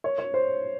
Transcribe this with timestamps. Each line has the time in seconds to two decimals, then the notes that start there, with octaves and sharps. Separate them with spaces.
0.04 C#5
0.18 C#5
0.34 C5